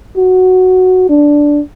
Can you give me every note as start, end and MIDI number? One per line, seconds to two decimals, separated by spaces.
0.17 1.09 66
1.09 1.61 62